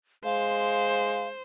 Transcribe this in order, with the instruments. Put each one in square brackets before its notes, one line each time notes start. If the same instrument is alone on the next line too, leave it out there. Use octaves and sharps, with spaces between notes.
[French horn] G#3 [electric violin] C5 [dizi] F5